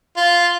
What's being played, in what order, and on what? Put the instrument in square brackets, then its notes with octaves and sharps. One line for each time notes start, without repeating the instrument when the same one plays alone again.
[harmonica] F4